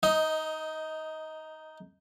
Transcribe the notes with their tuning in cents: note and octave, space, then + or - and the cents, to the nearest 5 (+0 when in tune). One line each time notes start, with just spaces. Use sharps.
D#4 +0 D#5 +20